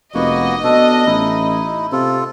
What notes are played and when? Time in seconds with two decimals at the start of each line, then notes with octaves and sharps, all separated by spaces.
0.14 F1 A#3 B3 F#4 D#5
0.64 B2 D4 A4
1.06 A1 D#4 E4
1.92 C3 F4 A4